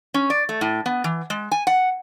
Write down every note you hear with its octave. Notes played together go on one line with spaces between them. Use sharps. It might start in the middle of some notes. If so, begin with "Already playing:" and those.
C#4
D5
A3
A2
B3
E3
G#3
G#5
F#5